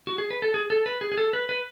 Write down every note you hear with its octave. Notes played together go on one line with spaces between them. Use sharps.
F#4
G#4
B4
A4
G#4
A4
B4
G#4
G#4
A4
B4
B4